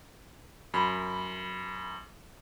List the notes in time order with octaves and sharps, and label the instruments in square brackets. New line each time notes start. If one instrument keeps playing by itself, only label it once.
[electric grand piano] F#2 [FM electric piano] B5